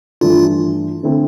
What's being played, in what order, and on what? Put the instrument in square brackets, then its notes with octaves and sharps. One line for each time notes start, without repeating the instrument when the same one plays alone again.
[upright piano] G2 E3 A3 D4 [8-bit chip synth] F4
[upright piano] D3 A3 C4 E4